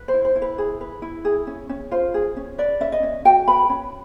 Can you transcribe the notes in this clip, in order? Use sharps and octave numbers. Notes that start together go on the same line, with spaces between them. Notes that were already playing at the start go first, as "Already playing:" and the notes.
Already playing: B4
C5
E4
C5
E4
B4
G#4
B4
E4
G#4
C#4
C#4
F4 C5
G#4
C#4
B4 D5
C#4 E5
D#5
C#4
F#4 G5
B4 B5
C#4